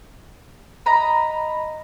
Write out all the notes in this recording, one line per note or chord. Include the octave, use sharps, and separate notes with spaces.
D#5 A#5 B5